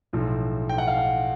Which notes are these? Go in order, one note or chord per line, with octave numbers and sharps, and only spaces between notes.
B1 A2 F3
G5
F#5
F5
F#5